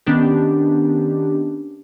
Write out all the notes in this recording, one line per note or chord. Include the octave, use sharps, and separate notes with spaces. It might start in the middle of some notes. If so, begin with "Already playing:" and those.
D#3 B3 C#4 D4 G4